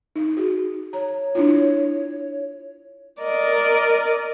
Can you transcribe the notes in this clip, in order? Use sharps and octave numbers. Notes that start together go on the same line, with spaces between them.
D#4
F#4 G#4
C#5 A#5
D4 E4 F4
A#4 D5 D#5